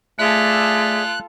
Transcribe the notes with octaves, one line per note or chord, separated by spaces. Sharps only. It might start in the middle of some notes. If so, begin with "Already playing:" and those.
A3 F4 G#4 A4 D5 E5 F#6